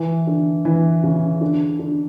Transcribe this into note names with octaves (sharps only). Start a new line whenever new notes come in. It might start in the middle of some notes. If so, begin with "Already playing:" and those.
Already playing: E3
D3
E3
C#3
D3
D3